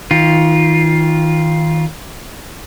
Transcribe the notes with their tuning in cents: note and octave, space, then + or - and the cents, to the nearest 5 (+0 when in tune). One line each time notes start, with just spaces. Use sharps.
D#3 +30 F4 +0